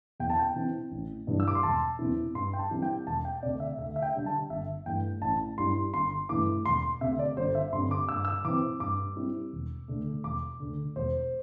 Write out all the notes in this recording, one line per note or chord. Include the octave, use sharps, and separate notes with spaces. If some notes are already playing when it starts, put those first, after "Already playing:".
E2 G5
A5
G5
E3 C4 E4
A1
G2 E3 G3 D4
E6
D6
C6
E1 A5
E2 E3 C4 E4
G2 C6
G5
A5
E3 G3 C4 E4
G5
E1 A5
G5
D2 C3 D5
E5
D2 E5
E5
G5
D3 G3 D4
A5
G1 E5
G2 E3 A3 G5
A1 A5
G2 G3 E4 C6
G1 C6
G2 E3 A3 E4 D6
E1 C6
D2 C3 E5
D5
G1 C5
E5
G2 D3 G3 C4 C6
D6
G2 E6
D6
E6
E3 C4 D6
G2 D6
G3 C4 E4
E1
D2 D3 A3
E1 D6
D2 D3
E1 C5